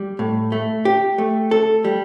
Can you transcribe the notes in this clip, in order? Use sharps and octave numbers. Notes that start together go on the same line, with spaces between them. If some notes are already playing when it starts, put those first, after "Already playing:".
Already playing: G3
A2
A3
G4
A3
A4
G3